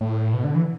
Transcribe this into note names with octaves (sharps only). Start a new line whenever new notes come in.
A2
B2
D3
E3